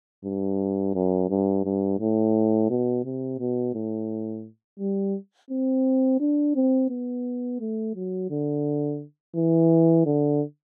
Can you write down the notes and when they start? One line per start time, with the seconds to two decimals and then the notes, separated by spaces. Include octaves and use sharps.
0.25 G2
0.95 F#2
1.29 G2
1.65 G2
2.00 A2
2.70 B2
3.05 C3
3.39 B2
3.74 A2
4.79 G3
5.51 C4
6.20 D4
6.56 C4
6.90 B3
7.60 A3
7.96 F#3
8.31 D3
9.36 E3
10.06 D3